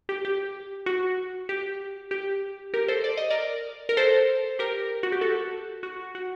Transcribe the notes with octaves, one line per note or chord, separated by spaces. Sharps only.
G4
G4
F#4
G4
G4
G4 A#4
A4 C5
D5
D#5
A#4 D5
A#4
A4 C5
G4 A#4
F#4
G4
F#4 A4
F#4
F#4